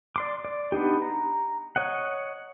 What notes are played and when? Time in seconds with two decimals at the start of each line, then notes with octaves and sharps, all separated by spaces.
0.16 D5 C6 D6
0.45 D5
0.72 B3 D4 D#4 G4
1.02 A#5
1.76 C#5 D#5 F#5